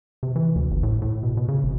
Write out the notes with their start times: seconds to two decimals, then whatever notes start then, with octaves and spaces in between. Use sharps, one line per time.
0.23 C3
0.36 E3
0.56 D2
0.71 G1
0.83 A2
1.02 A2
1.23 B2
1.37 B2
1.48 C#3
1.63 G#1